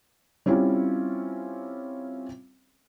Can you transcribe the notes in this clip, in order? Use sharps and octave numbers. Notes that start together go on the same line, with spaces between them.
G3 C4 C#4 E4 F4